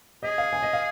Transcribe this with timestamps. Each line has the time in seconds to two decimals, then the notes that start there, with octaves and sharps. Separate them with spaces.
0.23 G#4 D#5
0.38 F5
0.53 G#5
0.63 D#5
0.73 F5